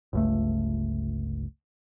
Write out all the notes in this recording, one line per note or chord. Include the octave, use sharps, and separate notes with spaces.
G1 C#2 A3